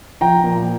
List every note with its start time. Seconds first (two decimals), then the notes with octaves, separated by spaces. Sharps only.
0.21 F3 G5 A#5
0.44 A#2